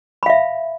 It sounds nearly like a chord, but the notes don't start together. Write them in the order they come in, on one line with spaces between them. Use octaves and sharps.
B5 F5 E5